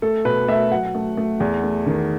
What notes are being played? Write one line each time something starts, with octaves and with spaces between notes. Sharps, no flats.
A3 A4
B2 B4
A3 E5
F#3 F#5
A3
A3
E2
A3
D#3